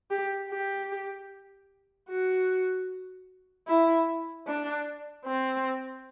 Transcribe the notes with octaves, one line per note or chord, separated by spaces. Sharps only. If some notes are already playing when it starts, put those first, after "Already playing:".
G4
G4
F#4
E4
D4
C4